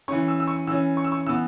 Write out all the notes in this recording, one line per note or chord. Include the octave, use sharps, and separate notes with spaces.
E3 C#4 C#6
E6
E6
C#6
E3 C#4 E6
C#6
E6
C#6
E3 B3 E6